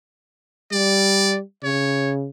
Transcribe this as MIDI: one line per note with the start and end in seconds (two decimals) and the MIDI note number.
0.72 1.41 55
0.72 1.36 74
1.63 2.29 49
1.63 2.13 73